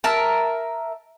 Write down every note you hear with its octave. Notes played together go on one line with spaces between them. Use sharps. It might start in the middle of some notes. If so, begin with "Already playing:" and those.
A#4 E5 A5